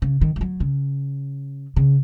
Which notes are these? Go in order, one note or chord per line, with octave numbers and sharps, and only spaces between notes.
C#3
D#3
F3
F#3
C#3
C#3